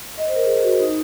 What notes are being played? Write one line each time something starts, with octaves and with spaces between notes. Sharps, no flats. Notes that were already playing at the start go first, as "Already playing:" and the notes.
D#5
C5
A#4
G#4
F#4
D#4